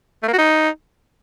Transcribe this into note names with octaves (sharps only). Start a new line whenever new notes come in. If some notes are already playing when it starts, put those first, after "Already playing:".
A3
A#3
F#4
D#4